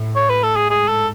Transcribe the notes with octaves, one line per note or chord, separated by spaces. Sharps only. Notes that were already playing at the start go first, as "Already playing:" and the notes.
Already playing: A2
C#5
B4
A4
G#4
G#2 G#4
A4